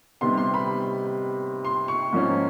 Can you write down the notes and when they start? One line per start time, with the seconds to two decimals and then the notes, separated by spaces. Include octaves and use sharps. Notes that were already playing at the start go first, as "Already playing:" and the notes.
0.21 C3 D#3 G3 B3 C6
0.37 C6
0.54 B5
1.65 C6
1.88 C#6
2.13 G#2 F3 A#3 C#4